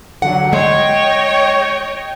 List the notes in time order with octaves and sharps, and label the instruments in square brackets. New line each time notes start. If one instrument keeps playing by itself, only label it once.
[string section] D3 F#3 [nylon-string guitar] F#5
[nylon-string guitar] G#3 [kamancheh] C#5 [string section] D#5 G5